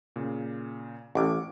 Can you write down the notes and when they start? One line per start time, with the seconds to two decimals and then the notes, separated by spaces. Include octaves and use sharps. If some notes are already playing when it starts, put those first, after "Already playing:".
0.16 A#2 C#3
1.15 A1 C#6 D6